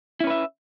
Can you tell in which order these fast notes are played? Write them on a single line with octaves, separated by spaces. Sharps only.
E4 C#4 B4 E5